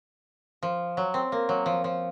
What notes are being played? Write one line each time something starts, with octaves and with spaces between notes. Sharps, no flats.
F3
F#3
C4
A#3
F#3
F3
F3